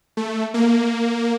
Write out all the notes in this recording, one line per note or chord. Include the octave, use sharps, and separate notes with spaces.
A3
A#3